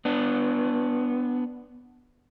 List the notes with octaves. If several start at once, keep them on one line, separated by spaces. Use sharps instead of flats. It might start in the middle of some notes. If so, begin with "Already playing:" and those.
B3 D4